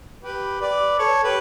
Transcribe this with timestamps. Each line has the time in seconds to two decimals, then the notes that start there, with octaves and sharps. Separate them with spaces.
0.23 G4 B4
0.60 B4 D5
0.98 A4 C#5
1.24 G4 B4